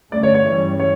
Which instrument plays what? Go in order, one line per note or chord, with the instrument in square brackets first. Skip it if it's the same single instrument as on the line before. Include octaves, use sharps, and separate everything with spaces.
[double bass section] G2 D3 A3 C#4 [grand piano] D5
[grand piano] C#5
C#5
[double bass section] G2 E3 G3 C#4 [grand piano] C#5
[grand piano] C#5